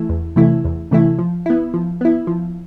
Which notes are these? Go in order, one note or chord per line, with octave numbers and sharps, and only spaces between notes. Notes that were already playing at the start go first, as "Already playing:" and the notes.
Already playing: E3 A3 E4
E2
C3 E3 A3 E4
E2
C3 E3 A3 E4
F3
B3 E4
F3
B3 E4
F3